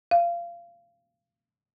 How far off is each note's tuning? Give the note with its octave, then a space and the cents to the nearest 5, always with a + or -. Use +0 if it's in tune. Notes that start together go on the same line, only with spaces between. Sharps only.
F5 -25